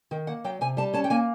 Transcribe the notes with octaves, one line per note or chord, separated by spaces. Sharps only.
D#3 G5
A#3 F#5
F#3 G5
C3 G#5
G3 A5
C#4 A5
G5
A#3 G#5